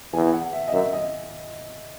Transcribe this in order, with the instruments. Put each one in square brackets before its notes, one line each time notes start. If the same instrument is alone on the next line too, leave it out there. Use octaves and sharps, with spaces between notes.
[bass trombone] E2 [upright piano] G#5
[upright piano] F#5
E5
D#5
[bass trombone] F#2 [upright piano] E5
[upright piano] D#5